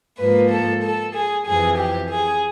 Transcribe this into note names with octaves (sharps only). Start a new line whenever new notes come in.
G#2 F3 A#3 B4
A4
A4
G#4
F2 C3 E3 G#4
G4
G#4